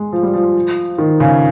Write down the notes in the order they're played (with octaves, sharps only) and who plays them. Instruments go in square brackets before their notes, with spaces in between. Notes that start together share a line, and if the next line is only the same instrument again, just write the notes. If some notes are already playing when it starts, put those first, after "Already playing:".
Already playing: [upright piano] G#3
F3
G3
F3
D#3
C#3